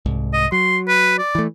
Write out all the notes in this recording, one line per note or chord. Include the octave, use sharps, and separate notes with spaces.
C2 G#2
D#5
F#3 C6
B4
D5
E3 A3